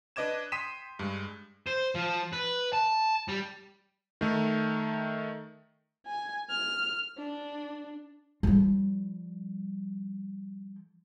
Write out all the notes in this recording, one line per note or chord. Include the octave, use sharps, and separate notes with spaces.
D4 B4 D#5 D6 G#6 E7
G5 C6 D#6 B6 D#7 E7
G2 G#3
C5
F3
B4
A5
G3
D#3 A3
G#5
F6
D4
F3 G3